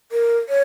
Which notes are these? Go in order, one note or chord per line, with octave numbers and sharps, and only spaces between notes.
A#4
C#5